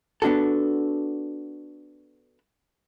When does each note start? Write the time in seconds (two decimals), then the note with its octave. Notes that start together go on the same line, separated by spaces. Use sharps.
0.22 B3 D4 F#4 A4